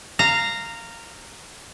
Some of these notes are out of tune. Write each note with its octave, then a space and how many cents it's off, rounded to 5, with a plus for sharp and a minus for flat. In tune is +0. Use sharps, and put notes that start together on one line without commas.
F5 -5 A#5 -15